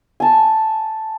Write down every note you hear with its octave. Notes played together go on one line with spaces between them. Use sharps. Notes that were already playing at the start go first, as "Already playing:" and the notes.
G#5 A5